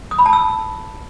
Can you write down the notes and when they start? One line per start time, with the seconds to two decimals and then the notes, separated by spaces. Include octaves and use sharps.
0.11 D#6
0.18 B5
0.26 A5
0.33 E6